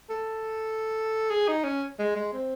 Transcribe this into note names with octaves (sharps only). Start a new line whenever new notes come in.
A4
G#4
D#4
C#4
G#3
G#3
C4